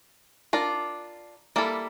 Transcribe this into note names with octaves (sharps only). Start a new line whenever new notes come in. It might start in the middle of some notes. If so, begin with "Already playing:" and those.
D4 F4 A#4
G3 A#3 E4 A4